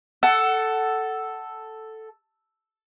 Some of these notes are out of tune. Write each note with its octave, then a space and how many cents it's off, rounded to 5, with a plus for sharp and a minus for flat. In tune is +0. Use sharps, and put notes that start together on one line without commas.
A4 +0 F#5 +15